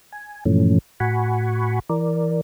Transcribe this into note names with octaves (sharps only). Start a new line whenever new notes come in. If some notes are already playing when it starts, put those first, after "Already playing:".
G#5
G2 A#2 E3 F3 A3 C#4
A2 F#4 F#5 G#5 B5 C#6
E3 A#4 D5